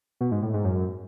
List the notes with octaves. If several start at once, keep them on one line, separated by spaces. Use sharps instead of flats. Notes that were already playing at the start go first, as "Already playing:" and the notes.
B2
G#2
A2
G#2
F#2